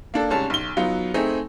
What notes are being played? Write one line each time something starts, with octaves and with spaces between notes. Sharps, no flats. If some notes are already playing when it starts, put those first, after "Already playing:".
A#3 D4 A4
C2 G#2 C#4 A5
B1 G7
F#3 B3 D#4 F4
A3 C4 D#4 G#4